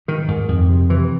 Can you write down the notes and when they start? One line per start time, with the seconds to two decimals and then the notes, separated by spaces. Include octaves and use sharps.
0.08 G#2 D#3
0.28 G#2
0.49 F2
0.69 C3
0.89 C3 E3